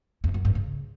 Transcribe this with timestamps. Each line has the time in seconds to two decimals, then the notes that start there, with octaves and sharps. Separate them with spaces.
0.24 E2
0.34 F#2
0.45 G2
0.55 C#3